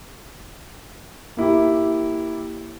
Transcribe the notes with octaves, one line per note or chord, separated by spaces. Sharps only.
A#3 E4 G4